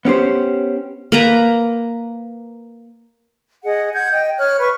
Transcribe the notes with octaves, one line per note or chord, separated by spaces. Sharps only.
B3 C#4 G4 C5
A#3 B4 A#5
G#4 D#5 F#5
F#5 G6 G#6
D#5 G5
C#5 F6 F#6
B4 C#6